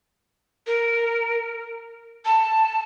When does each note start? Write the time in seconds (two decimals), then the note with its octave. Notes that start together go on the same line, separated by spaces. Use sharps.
0.67 A#4
2.25 A5